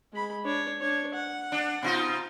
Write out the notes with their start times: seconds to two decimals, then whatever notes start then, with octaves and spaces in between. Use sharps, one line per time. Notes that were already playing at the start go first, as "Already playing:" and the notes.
0.13 G#3 B5
0.45 D4 C#5
0.81 D4 C#5
1.14 F#5
1.52 D4
1.83 B2 D#4 F4